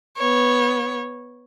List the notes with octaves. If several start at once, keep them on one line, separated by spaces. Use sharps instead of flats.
B3 C#5